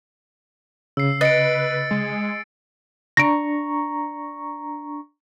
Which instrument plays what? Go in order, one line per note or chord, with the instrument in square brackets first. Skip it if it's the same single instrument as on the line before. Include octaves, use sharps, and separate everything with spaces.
[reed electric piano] C#3 [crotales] E6 C7
[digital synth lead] B4 [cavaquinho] D#5 [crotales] A6 C#7 D7
[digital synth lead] G#3
[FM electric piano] D4 A#5 C#6 [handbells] A#6 D7